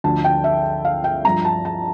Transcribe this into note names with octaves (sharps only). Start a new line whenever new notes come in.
D2 D3 F3 A5
G5
E5
F5
G5
G2 F3 A#5
A5
A5